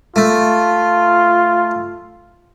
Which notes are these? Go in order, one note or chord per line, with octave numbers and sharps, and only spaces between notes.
A3 F4